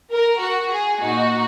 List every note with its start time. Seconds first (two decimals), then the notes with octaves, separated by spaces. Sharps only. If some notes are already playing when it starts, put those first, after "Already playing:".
0.12 A#4
0.42 F#4
0.71 G#4
1.00 A#2 A#3 D#4 F#4